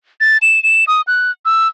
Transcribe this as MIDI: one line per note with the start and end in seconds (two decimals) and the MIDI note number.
0.21 0.38 93
0.42 0.62 100
0.63 0.85 100
0.87 1.02 87
1.07 1.31 90
1.45 1.68 88